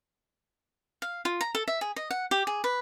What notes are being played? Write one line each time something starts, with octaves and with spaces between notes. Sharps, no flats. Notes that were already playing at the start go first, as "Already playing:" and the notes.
F5
F4
A#5
A4
E5
G#4
D#5
F#5
G4
G#4
B4